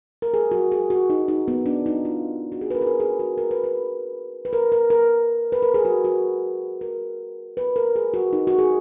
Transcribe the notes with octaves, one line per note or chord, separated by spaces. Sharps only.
A#4
G#4
F#4
G#4
F#4
D#4
D#4
B3
D4
D#4
F4
F#4
G#4
B4
A#4
G#4
A#4
G#4
F#4
A#4
B4
B4
B4
A#4
A#4
A#4
B4
A#4
G#4
F#4
F#4
A#4
B4
A#4
G#4
F#4
D#4
F#4
G#4